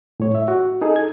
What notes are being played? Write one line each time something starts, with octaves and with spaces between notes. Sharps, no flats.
A2 C#5
E5
F#4
D#4 G#4 A4
G#6